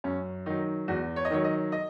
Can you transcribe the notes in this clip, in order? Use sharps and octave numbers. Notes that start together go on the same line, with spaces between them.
F#2 C#4
D#3 F#3 D#4
E2 F#4
C#5
D#5
D#3 F#3 C#5
D#5
D#5